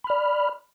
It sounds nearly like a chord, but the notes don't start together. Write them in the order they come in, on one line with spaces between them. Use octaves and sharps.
B5 F6 D5